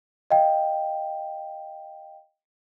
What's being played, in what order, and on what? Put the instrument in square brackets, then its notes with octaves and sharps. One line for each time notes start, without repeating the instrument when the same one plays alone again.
[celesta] D#5 F5 G5